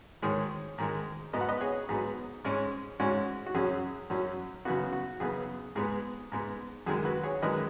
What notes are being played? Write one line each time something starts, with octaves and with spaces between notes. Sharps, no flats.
G#2 D#3 G#3 G#4 C#5
G#2 D#3 G#3
G#2 F#3 B3 D#5
F#5
B4 D#5
G#4 C#5
G#2 F#3 B3 G#4
G#2 G#3 C#4
G#2 G#3 C#4 F#4
F#4
F#2 F#3 C#4 G#4
F#2 F#3 C#4
F#2 C#3 B3 F#4
F#4
F#2 C#3 B3 G#4
G#2 G#3 B3 G#4
G#2 G#3 B3
F#2 D#3 G#3 G#4
F#4 B4
G#4 C#5
F#2 D#3 G#3 B4 D#5